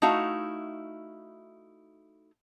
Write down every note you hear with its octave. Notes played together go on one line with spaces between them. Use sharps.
A3 D#4 E4 F#4 F5